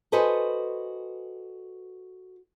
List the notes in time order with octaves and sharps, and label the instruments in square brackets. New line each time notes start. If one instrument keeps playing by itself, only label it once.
[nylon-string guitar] F#4 A4 B4 C5 D#5 G#5